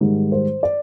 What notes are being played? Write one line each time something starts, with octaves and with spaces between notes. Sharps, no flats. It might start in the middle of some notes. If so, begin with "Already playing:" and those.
G#2 D#3 G3
C5
D5